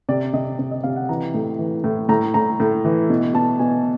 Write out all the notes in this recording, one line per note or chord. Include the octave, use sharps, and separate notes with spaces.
C3 D5
C3 D#5
C3
D#5
C3 F5
F#5
E3 A#5
A2
E3
A2
A2 A#5
A2 A#5
A2
E3
B2
B2 A5
B2 G#5